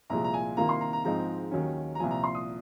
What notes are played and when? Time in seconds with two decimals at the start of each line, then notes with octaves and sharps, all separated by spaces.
0.10 C2 A#2 F3 G#3 A#5
0.24 A#5
0.34 G#5
0.57 C2 C3 D#3 A#3 F4 A#5
0.69 C6
0.81 A#5
0.93 A#5
1.05 G#2 F3 G#3 C4 D#4 A#5
1.51 D#2 D#3 F#3 C#4
1.95 A#5
2.00 C2 A#2 F3 G#5
2.11 A#5
2.24 C6
2.35 D#6